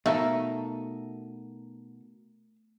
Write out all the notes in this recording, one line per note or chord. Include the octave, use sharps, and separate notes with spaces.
B2 A3 D#4 A4 A#4 E5 F5